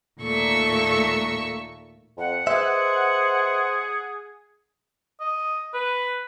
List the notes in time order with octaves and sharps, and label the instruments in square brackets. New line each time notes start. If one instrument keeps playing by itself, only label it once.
[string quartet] D#2 A#2 A3 A4 C#6 E6
[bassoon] F2 [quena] F#5
[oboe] G#4 [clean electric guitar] B4 D#5 E5 [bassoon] C5
[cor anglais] D#5
B4